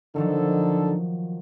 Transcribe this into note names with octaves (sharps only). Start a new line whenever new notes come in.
D3 D#3 F3 F#3 D#4 A4